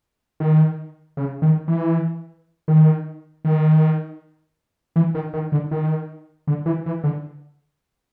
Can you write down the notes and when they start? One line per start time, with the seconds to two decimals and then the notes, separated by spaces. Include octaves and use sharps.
0.40 D#3
1.17 C#3
1.42 D#3
1.68 E3
2.68 D#3
3.45 D#3
4.96 E3
5.15 D#3
5.33 D#3
5.52 D3
5.71 D#3
6.47 D3
6.66 E3
6.86 E3
7.04 D3